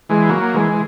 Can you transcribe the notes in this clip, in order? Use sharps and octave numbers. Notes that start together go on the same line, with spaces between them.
E3 G#3
F#3 A#3
E3 G#3
E3